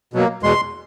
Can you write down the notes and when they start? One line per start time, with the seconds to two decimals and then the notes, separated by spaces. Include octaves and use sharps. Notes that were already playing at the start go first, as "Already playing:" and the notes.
0.14 B2 F#3 A#3
0.43 E2 B2 G#3 C6